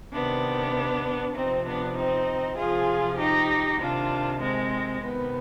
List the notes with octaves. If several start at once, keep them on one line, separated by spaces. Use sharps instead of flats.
C3 D#3 B3 D4
C3 F3 C4 D#4
B3 D4
C4 D#4
C3 F3 F4 G#4
D#4 G4
C3 D#3 D4 F4
G#3 C4
C3 D#3 B3